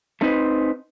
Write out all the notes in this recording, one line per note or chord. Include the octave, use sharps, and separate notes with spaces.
A3 C4 D#4 B4 C5